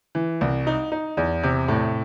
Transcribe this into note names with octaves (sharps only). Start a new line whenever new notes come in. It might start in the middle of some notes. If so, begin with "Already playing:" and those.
E3
C2
D#4
D#4
E2
C3
A2